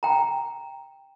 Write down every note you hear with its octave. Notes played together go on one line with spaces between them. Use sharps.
G5 A#5